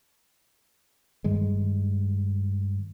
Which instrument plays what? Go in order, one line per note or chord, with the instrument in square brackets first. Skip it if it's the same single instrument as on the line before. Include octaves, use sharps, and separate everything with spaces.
[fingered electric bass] G2 D#3 G3 G#3